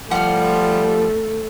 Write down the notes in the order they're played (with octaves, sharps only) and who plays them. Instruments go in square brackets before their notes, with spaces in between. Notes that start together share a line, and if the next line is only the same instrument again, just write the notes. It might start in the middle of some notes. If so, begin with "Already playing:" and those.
[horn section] F3 G3 [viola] A3 [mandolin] F#5 F6